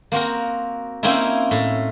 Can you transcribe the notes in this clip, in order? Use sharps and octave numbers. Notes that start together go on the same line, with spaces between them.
A#3 C4 F#4 A#4
A#3 C4 C#4 D#4 E4
A2